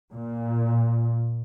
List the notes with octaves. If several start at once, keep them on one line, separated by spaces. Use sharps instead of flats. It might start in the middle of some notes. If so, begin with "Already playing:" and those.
A#2